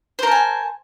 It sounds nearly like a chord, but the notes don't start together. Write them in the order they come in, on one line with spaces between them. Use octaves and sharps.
C5 A#4 A5 G#5